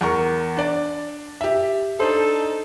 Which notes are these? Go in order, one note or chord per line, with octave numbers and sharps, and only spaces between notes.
E2 A#4 C#6
D4 D5
G4 E5
D4 D#4 A4 C5